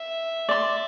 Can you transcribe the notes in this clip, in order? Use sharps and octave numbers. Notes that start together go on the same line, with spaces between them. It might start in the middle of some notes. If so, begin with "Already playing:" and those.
Already playing: E5
D5 C6